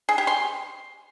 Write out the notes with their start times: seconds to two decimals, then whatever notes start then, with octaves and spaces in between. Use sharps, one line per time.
0.09 G#4
0.18 G4
0.27 C6